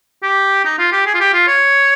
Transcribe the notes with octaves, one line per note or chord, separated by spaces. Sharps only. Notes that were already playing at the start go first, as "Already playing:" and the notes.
G4
D#4
F4
G4
G#4
F4
G4
F4
C#5